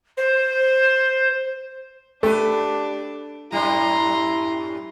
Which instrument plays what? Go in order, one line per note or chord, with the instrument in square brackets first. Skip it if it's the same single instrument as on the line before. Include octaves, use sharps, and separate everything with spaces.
[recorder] C5
[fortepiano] A3 [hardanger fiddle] D4 [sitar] G4 B4
[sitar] F#2 A2 G3 [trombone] E4 [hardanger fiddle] A#5 C6